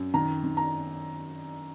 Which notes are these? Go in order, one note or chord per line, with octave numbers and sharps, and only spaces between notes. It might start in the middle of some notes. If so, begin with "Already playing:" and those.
Already playing: F#2
D#3 A#5
D#3
A#5